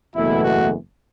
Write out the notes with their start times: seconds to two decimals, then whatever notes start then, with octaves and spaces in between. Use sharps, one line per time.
0.15 F#1 E2 B2 A3 E4
0.44 F#4